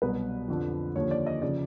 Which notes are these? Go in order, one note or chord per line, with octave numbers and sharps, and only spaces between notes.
C2 B2 F#3 B4
F2 D3 F3
D#2 D3 F3 C#5
D5
D#5
C#3 F3 D5